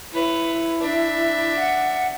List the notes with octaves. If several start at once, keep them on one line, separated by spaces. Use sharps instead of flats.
E4 B4 C#5
D4 E5
F#5